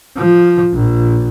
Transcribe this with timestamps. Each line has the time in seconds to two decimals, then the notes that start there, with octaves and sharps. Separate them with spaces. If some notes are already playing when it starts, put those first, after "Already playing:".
0.17 F3
0.74 A#1